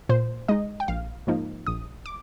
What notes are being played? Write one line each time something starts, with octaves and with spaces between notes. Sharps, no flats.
A#2 C5
G#3 D#4 D#5
G5
A#1 F5
G#2 F3 A#3 D#4
A#1 D#6
D6